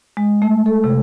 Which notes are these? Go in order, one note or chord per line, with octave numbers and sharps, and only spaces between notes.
G#3
A3
A4
C3